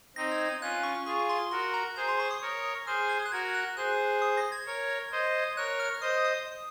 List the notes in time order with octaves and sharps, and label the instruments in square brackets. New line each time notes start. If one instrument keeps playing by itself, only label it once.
[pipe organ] C4 D#4 [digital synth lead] A#6
[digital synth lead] G#6
G#6
[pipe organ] C#4 F4 [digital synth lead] F#6
[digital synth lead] C#6
[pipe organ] F4 G#4 [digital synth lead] C#6
[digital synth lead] C6
[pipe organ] F#4 A#4 [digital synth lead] C6
[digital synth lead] A#5
[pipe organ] G#4 C5 [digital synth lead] A#5
[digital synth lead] C6
C#6
D#6
[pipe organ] A#4 C#5
[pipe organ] G#4 C5 [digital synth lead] F6
[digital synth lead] G#6
F#6
[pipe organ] F#4 A#4 [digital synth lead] G#6
[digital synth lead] F#6
[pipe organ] G#4 C5 [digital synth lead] F#6
[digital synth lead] D#6
A#6
G#6
[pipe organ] A#4 C#5
C5 D#5
[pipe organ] A#4 C#5 [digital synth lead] F#6
[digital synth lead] F6
F6
[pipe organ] C5 D#5 [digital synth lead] D#6
[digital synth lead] D#6